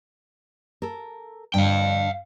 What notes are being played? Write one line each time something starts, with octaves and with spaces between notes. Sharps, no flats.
A4 A#4
G2 D3 F5 G5